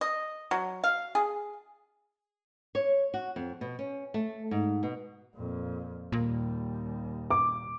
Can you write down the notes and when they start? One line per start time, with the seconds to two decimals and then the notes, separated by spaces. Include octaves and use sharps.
0.01 D#5
0.51 F#3
0.84 F5
1.15 G#4
2.75 C#5
3.14 F#4
3.36 F2
3.61 B2
3.79 C#4
4.14 A3
4.51 G#2
4.83 B2
5.34 F2 A#2
6.12 D#2 A#2 G3
7.30 D6